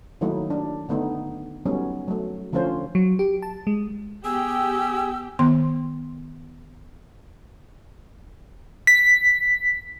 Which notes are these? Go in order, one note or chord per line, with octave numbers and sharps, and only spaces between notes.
D#3 F#3 A3 A#3 D#4 E4
D4
D3 A3 B3 D#4
F#3 G3 A3 B3 C#4 D#4
F#3 A3
D3 F3 A3 C#4 F4 C5
F#3
G4
A5
G#3
B3 G4 G#4 G5 D#6 E6
D#3 B3 C6
B6